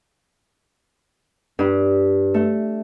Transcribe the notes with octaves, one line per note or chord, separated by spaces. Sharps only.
G2
A3